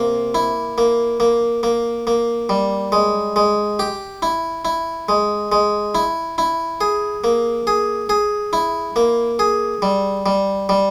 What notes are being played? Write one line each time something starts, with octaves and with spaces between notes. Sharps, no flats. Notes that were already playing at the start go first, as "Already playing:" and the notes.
Already playing: C3 A#3
E4
A#3
A#3
A#3
A#3
G3
G#3
G#3
G4
E4
E4
G#3
G#3
E4
E4
G#4
A#3
G#4
G#4
E4
A#3
G#4
G3
G3
G3